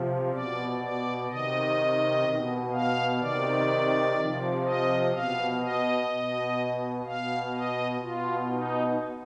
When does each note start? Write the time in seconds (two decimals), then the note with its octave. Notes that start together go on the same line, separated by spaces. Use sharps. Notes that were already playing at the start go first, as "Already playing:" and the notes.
Already playing: C3 F3
0.32 B2 D5
0.80 D5
1.28 C3 D#3 D#5
2.24 B2
2.72 F5
3.20 C3 D#3 D5
4.17 C3 F3
4.65 D#5
5.12 B2 F5
5.61 D#5
6.09 B2
7.05 B2 F5
7.53 D#5
8.01 B2 F4
8.49 D#4